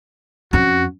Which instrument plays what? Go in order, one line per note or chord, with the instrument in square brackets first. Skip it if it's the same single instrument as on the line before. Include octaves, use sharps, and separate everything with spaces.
[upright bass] F2 C#4 [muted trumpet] F#4